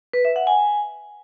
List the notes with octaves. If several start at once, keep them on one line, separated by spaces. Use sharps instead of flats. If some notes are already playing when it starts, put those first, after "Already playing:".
B4
E5
F#5
G#5